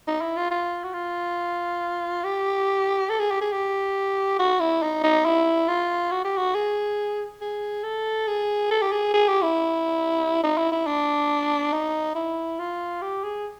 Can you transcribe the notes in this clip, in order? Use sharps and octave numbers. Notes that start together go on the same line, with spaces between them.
D#4
E4
F4
F4
F#4
F4
G4
A4
G#4
G4
G#4
G4
F#4
E4
D#4
D#4
E4
F4
F#4
G4
F#4
G#4
G#4
A4
G#4
A4
G4
G#4
G#4
G4
E4
D#4
E4
E4
D4
D#4
E4
F4
G4
G#4